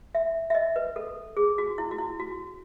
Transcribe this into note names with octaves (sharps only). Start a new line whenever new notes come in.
E5
E5
D#5
B4
A4
G#4
F#4
E4
F#4
E4
F#4